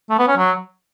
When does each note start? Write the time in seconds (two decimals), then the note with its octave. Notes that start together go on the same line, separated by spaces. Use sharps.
0.10 A3
0.19 B3
0.28 C#4
0.37 F#3